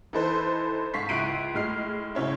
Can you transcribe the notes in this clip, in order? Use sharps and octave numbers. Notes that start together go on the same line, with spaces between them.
E3 D#4 A4 B4 C5
G#2 F5 C#6 B6 C7
C#2 E4 F#6 C7 D7 D#7
A2 G#3 F6 C7
G#2 C#3 C#4 E4